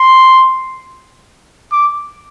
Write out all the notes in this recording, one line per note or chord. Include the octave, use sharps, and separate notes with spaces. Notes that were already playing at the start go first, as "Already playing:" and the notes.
Already playing: C6
D6